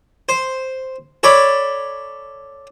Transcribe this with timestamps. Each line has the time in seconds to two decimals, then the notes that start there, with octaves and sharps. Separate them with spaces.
0.29 C5
1.23 A4 C#5 D5 B5